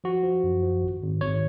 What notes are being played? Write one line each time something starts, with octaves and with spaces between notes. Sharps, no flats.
F3 F#4
F3
F#2
F3
G#1
G#1
G#1 C#5